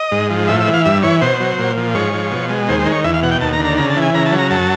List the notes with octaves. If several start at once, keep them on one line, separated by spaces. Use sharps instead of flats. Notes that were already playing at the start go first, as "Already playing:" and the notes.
Already playing: D#5
G#2
F3
A2 E5
E5
E3
F5
G2 E5
E3 C#5
B2 C5
F#3
A#2
F3
G#2 C#5
F3
B2
G#3
D#2 C5
C5
D#3
C#5
E2 E5
F5
B2 F#5
G5
D#2 A5
A#5
D3
A#5
C#3 A#5
A5
E3
G#5
C#3 A#5
A5
F#3
A#5
F#2 A5